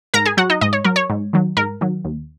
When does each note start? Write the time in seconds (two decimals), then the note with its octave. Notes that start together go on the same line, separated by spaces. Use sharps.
0.14 G#2 A#4 A#5
0.26 G#4 G#5
0.37 F#3 F#4 F#5
0.50 D#4 D#5
0.61 G#2 D#5
0.73 C#5
0.84 F#3 A#4
0.96 C#5
1.10 G#2
1.33 D#3 F#3
1.57 G#2 A#4
1.81 D#3 F#3
2.05 D#2